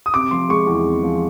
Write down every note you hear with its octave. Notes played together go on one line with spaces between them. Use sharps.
D#6
C3 D6
F3 C6
G#3 C#6
E2
C3
F3